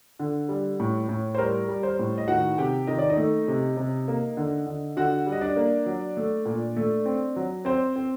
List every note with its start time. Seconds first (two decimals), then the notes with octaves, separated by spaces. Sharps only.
0.19 D3
0.49 G3
0.80 A2
1.09 A2
1.35 C5
1.38 G3 A#4
1.68 G3
1.83 C5
1.99 A2
2.18 D#5
2.28 D#3 F#4 F#5
2.58 C3 G4 G5
2.87 D#3 D#5
2.98 D5
3.10 D#4 D#5
3.17 A3
3.48 C3
3.77 C3
4.08 A#3
4.37 D3
4.66 D3
4.97 D3 F#4 F#5
5.26 G3
5.32 D#5
5.41 D4 D5
5.56 A#3
5.86 F#3
6.17 A3
6.45 A#2
6.77 A3
7.06 C4
7.36 F#3
7.65 C4 C5
7.96 C4